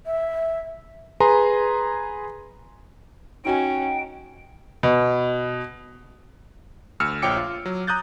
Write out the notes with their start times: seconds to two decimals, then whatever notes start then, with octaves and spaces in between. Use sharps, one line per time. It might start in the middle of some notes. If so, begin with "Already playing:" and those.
0.06 E5
1.20 G#4 B4 G#5 A#5 C6
3.45 C#4 D#4 F#4 G5 G#5
4.83 B2
7.00 D2 E6 F6 C#7
7.22 A#1 F3 C#5 G5 D6 C#7
7.37 F4
7.66 F#3
7.87 A#5 D#6 F#6 G6 A6